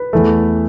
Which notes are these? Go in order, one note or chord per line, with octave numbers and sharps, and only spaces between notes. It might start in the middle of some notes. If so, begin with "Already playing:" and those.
Already playing: B4
E2 E3 A3